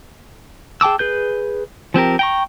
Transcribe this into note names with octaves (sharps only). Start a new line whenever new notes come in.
G#4 G5 A5 D6 E6
G#4 B4 G6
F3 C4 G4 A#4
G5 A#5 C#6